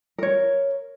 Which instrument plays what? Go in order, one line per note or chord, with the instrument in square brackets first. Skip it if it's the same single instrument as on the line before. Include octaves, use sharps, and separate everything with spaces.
[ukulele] A#4 C#5